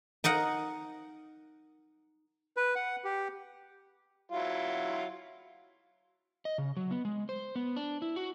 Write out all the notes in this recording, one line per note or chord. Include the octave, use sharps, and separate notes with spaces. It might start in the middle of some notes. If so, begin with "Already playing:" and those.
D#4 A#4 D#5 F#5
B4
F#5
G4
F#3 E4 F4
D#5
C#3
F#3
B3
G#3
C5
B3
D4
E4
F#4